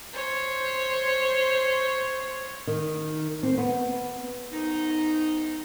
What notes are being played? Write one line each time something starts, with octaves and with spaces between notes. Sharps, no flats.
C5 C#5
D#3
C4
B3
G#2 D#3 B3 D#4